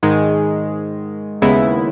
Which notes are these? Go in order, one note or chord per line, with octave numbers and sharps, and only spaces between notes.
G#2 D#3 G#3
D#2 C#3 G#3 B3 E4